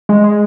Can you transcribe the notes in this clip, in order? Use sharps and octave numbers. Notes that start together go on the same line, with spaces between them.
G#3
G#3